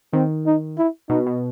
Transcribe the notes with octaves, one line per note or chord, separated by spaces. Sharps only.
D#3 C4
D#4
E4
B2 D#4
B2